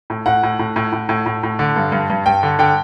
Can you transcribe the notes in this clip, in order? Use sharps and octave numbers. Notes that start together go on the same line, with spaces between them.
A2
A2 F#5
A2
A2
A2
A2
A2
A2
A2
D3
G2
G2
G2
G2 G5
D3
D3 G5